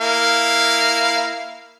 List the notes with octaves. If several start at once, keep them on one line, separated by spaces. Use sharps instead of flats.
A#3 E4 F5